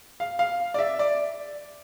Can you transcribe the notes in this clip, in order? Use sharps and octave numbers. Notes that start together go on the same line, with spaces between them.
F5
F5
D5
E5
D5